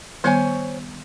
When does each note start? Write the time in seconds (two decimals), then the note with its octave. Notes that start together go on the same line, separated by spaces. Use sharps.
0.24 D#3 G3 B3 C5 C#5 G#5